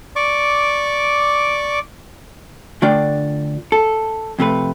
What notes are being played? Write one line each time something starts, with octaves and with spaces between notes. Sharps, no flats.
D5 C#6 D6
D3 A3 D4 F4 D5 G5
A4
F2 C3 A3 B4